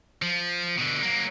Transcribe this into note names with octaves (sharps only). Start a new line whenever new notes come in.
F3
B2 D3
F#3 A#3